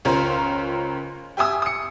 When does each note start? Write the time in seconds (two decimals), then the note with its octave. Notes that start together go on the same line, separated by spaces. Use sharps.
0.05 C#2 C#4 F4 A#4 C5
1.37 G4 E5 G#5 D#6 E6
1.62 D#6 C#7